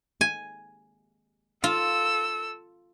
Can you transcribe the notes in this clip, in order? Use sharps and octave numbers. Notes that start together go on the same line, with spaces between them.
G#5
F4 A4 E6